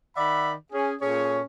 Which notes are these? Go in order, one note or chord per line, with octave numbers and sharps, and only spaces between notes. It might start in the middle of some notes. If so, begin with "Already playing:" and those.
D#3 D5 E5 F#5 B5
C#4 G#4
A#2 C#4 G#4 A4 C#5